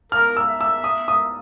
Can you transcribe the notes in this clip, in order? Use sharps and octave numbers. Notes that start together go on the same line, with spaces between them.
A#4 F6
E6
E5
E6
D#6
D#6